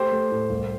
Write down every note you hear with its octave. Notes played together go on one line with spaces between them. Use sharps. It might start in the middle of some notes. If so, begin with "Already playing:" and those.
Already playing: A3 G4 C5
A3
A2
C2